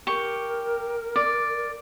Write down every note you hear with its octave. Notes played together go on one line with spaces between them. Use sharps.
G4 A#4 C#6
D5